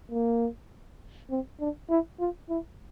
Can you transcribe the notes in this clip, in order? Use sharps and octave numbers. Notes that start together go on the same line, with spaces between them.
A#3
C4
D4
E4
F4
E4